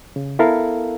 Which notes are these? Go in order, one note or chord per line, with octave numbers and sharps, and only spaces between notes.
C#3
B3 E4 A4 A#4 F5